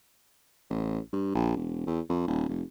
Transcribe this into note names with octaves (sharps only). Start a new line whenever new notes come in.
A1
G2
A#1
E1
E2
F2
D#1
F1